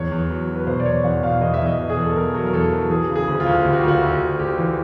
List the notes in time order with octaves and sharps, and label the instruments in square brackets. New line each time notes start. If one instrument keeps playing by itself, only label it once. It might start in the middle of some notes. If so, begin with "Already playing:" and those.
Already playing: [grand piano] E2 C#5
E2
F#3
F#3
B4
B2 C5
D5
E2 C#5
E2 F#5
B2 F5
E2 D#5
E5
E2
D#5
B2
G#4
E2
A4
E2 A#4
F#3
A#4
E2 A4
F#3
E3 G#4
C#3
G#4
D2
F4
D2
D2 G4
F#4
F4
D2 F#4
D2
D2
D2 G4
E3